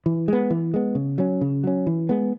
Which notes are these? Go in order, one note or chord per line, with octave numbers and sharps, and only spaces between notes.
E3
G#3 B3
E3
G#3 B3
C#3
F#3 C#4
C#3
F#3 C#4
E3
G#3 B3